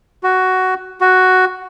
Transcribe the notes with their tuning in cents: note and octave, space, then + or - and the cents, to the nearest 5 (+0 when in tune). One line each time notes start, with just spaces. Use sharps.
F#4 +10
F#4 +5